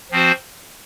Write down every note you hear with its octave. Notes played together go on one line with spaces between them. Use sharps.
F3 C4 F#4 C5